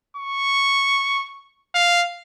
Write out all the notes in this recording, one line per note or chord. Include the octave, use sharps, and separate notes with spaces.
C#6
F5